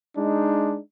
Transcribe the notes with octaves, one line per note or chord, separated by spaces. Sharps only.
G#3 D4 D#4